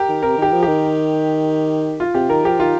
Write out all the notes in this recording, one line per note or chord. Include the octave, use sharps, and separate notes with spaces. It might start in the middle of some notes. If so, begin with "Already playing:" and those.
Already playing: G4 A#4
D#3
C3 A#4
D#3 G4
F3
D#3 G4
F4
C3 G4
D#3 A#4
F3 G4
D#3 F4